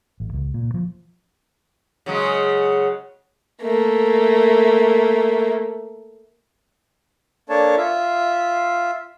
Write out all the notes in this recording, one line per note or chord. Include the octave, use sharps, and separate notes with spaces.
A1
C#2
A#2
F3
C#3 F#3 G#3
A3 A#3
A#3 D4 A4 C#5 A5
F4 E5